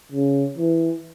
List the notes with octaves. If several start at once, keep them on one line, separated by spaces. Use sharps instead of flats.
C#3
E3